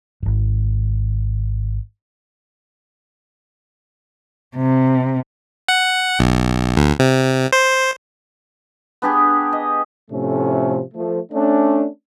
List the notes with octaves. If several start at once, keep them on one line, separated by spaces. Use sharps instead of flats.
D1 G#1
C3
F#5
B1
D2
C3
C5
B3 D4 G4 G#4
D#5
A2 C3 F3 A3 C#4
F3 A3
A3 C#4 D4